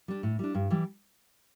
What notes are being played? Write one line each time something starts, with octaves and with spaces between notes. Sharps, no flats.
G3 D4
A2
G3 D4
G2
E3 G3